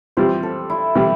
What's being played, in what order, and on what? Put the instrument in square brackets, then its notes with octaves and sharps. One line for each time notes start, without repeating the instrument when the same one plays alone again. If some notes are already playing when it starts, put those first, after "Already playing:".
[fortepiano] F2 E3 G3 [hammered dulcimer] C5
[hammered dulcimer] A4
E4
[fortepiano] E3 G3